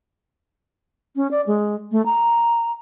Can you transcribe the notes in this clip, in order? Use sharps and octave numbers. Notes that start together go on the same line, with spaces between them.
C#4
D5
G#3
A3
A#5